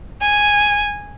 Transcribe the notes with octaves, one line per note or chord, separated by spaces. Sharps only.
G#5